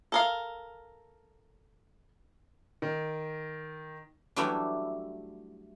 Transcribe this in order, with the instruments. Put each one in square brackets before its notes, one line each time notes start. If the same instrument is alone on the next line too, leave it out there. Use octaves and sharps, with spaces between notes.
[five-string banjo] A4 A#4 F5
[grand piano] D#3
[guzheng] E3 F#3 G3 A3 D4 E4